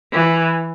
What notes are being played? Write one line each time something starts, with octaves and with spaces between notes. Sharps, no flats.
E3